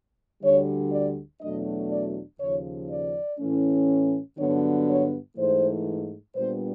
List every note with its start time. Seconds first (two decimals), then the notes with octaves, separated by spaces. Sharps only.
0.43 D2 D3 G3 C#5
0.92 D5
1.41 E2 B2 F#3 A3 D4 D#5
1.91 D5
2.40 D#2 C#3 F3 C#5
2.90 D5
3.40 A2 E3 A3 C#4
4.38 G2 D3 F#3 B3 D4 C#5
4.88 C#5
5.37 G#2 E3 A3 C5
6.36 A#2 G3 B3 D4 C5